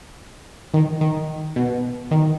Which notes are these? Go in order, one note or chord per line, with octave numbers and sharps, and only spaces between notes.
D#3
D#3
B2
D#3